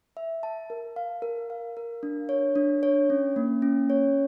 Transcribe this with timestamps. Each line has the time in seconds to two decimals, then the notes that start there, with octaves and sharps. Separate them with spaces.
0.17 E5
0.43 A5
0.70 A#4
0.96 F5
1.22 A#4
1.50 F5
1.77 A#4
2.03 D4
2.29 C#5
2.56 D4
2.83 C#5
3.10 C#4
3.36 A#3
3.62 C#4
3.90 C#5